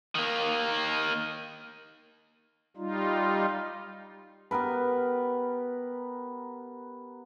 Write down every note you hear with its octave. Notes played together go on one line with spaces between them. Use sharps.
D#3 A#3
G3 D#4 F4
B3 G4 A#4 B4